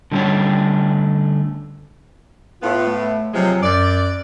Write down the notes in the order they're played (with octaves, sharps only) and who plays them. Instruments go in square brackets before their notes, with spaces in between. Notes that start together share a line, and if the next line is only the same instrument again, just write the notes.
[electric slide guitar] D3 G3 A3 C#4 D4 C#5
[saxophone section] A2 B3 [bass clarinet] F4
[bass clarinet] A3
[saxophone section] C3 F3 G#3 [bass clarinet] F#3
[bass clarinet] F#2 [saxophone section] D5